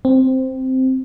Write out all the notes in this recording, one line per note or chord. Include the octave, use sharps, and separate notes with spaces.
C4